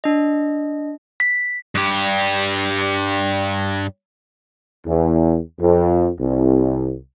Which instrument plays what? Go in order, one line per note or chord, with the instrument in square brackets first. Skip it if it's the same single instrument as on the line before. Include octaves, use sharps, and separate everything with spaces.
[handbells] D4 D#5
[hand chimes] B6
[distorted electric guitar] G2 G4
[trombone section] E2
F2
C2